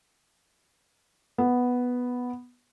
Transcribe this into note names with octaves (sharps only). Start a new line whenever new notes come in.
B3